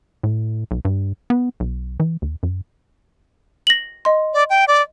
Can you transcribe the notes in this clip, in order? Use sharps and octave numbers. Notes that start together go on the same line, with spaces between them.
A2
B1
G2
B3
B1
E3
D#2
F#2
A#6 F#7
D#5 C6
D5
G5
D5